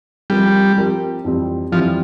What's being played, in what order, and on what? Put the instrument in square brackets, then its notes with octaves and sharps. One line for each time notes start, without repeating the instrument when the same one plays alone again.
[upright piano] F3 C4 G4 A#4 [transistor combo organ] G3
[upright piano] F3 C4 G4 A#4
F2 E3 G3 C4
[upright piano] F2 E3 G3 C4 [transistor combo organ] F3